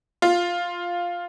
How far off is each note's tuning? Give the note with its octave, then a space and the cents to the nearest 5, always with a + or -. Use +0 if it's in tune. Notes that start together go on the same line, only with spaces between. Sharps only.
F4 +5